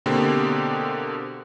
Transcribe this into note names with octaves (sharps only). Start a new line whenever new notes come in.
B2 D3 A#3 C4 G4